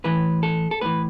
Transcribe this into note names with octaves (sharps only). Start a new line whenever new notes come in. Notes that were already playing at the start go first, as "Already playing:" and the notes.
A2 E3 B4
A4
A4
A2 E3 B4